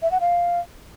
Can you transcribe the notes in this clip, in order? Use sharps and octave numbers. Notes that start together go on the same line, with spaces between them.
E5
F#5
F5